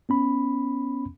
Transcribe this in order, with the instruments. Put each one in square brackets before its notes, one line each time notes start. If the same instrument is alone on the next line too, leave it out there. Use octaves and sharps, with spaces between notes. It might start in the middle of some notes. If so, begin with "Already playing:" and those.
[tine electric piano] B3 C#4 B5